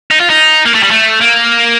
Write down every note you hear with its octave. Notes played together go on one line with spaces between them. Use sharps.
D#4
F4
D#4
A#3
A3
G3
A3
A#3